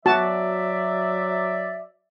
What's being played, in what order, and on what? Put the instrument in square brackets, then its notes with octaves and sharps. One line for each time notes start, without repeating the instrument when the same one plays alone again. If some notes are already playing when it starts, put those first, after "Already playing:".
[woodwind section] F#3 D5 E5 [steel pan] F#4 A5